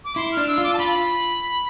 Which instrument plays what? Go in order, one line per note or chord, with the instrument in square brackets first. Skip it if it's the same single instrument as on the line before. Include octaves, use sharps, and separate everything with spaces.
[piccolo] D6
[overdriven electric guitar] E4 [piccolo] C6
[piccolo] F6
[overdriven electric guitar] D4
[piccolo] E6
[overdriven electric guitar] F4
[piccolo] D6
A5
[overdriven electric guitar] F4 [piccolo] B5